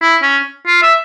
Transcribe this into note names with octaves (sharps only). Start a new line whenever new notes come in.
E4
C#4
F4
E5